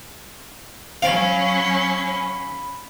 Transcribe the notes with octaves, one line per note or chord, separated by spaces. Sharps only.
F#3 C#4 F5 B5